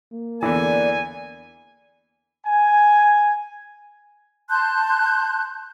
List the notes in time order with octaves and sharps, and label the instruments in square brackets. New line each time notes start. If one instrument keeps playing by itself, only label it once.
[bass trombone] A#3
[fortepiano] E2 D3 E3 [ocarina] D5 [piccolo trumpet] G#5
[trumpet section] G#5
[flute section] A5 C6 F#6 G6